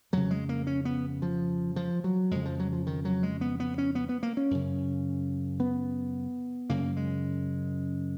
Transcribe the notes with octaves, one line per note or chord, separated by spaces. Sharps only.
F2 C#3 F#3
G#3
A#3
C#4
B3
F3
F3
F#3
F2 C#3 G#3
F3
F#3
F3
D#3
F#3
G#3
B3
B3
C#4
B3
B3
A#3
C#4
F#2 C#3
B3
F#2 C#3 A#3
G#3